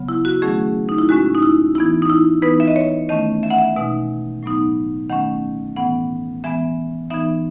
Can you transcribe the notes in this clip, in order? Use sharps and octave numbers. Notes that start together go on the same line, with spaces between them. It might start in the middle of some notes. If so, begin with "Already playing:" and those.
Already playing: C#3 F#3 B3
E4
F#4
D#3 F#3 A3 C#4 G#4
D#4
E4
A2 G#3 C#4 F#4
D#4
E4
E3 B3 D#4 E4
D#4
E4
E3 B3 D#4 B4
E5
D#5
C#5
D#3 A3 C#4 D#5
E5
F#5
E5
B2 G#3 D#4
A2 F#3 B3 D#4
D#3 A3 C#4 F#5
A2 E3 B3 F#5
E3 G#3 B3 E5
E3 B3 D#4 E5